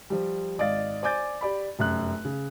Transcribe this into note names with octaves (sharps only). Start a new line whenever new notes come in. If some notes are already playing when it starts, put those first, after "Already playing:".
F3 G3
G#1 D5 D#5 F5 A6
C5 D5 G#5 D6 G6 A6
G4 D5 B5
F1 F#2 F#6
C#3